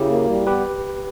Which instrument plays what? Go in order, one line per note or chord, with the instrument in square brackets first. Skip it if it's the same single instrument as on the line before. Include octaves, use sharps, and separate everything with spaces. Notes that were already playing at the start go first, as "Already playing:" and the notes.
Already playing: [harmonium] C#3 [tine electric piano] E4 F#4 G4 A#4
[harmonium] A#3
G3
[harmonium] B3 [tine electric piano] G4 B4